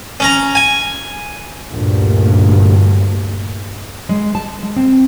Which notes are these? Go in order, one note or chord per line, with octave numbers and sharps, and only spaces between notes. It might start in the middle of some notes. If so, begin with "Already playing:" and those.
C#4 A#5
G#5
D2 G2 A#2
G#3
A5
G#3
C4